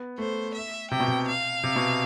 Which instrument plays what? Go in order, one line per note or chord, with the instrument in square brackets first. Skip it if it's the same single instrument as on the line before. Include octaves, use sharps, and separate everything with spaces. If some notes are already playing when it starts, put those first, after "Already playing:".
Already playing: [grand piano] B3
[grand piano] A3 [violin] C5
[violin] E5
[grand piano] C3 [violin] G5
[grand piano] B2
C3
[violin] F5
[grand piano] C3
B2